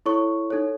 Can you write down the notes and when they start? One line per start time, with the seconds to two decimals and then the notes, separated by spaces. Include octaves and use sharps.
0.06 E4 A4 C#5 C#6
0.50 D#4 A4 C#5